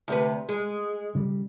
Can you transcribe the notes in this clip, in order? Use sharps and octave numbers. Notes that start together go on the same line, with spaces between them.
D2 C3 B4
G#3
C#3 G3